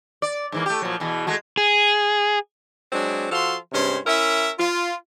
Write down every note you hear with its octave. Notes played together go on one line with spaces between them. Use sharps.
D5
G#2 E3 A#3
A3 G4
A#2 F3 F#3
E2 B2 E3
G#3 A3 F#4
G#4
F#3 G#3 C4 D4
F3 F#4 A4 F5 C6
G2 C3 G#3 C#4 C5
C#4 E4 A#4 E5
F4